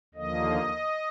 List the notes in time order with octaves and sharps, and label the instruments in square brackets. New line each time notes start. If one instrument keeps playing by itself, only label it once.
[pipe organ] D#2 D3 F3 A#3 D#5